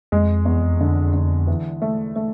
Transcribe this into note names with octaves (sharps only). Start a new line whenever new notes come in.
F2 G#3
E2
D3
D3
E3
A3
A3